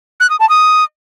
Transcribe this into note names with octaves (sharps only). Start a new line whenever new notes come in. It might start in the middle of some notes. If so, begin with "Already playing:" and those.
F#6
D#6
A5
D#6